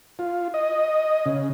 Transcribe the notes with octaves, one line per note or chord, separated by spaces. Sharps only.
F4
D#5
C#3